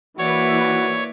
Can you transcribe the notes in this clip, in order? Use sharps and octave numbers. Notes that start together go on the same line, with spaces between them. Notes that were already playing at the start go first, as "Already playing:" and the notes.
E3 A#3 E4 F#4 B4 C#5 D5